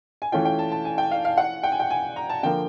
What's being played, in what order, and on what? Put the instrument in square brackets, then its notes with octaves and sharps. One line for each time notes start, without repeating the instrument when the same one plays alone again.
[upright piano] G#5
[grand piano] E3 A3 C#4 F4 [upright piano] G5
[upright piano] G5
A5
A5
G#5
G5
F5
F5
F#5
G5
G#5
G5
G#5
A#5
A5
[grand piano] D3 F3 A#3 [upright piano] G5